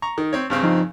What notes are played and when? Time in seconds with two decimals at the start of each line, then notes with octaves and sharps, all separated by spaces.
0.02 A#5 C#6
0.18 D#3
0.33 C4 C#5
0.50 G2 C#3 C4
0.63 F3 D#4